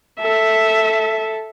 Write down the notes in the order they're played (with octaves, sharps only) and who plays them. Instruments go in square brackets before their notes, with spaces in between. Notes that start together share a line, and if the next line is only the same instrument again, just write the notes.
[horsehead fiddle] A4 [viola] E5